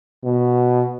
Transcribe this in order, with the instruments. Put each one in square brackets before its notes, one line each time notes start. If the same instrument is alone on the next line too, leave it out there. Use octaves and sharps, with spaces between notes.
[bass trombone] B2